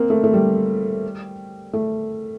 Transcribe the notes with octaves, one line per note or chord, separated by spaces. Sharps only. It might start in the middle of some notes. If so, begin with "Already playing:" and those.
Already playing: A#3 C4
A3
A3
G3
A3